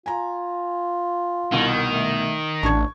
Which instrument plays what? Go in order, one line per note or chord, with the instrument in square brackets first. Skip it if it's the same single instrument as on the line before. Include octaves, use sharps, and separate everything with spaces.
[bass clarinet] F4 [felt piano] G#5 A#5
[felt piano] C2 B2 [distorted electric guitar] D#3
[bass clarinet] A3
[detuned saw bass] A1 [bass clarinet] D4 [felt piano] C#6 G#6